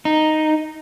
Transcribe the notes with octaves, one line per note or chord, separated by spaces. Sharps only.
D#4